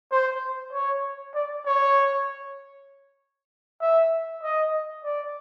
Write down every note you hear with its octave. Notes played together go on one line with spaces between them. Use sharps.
C5
C#5
D5
C#5
E5
D#5
D5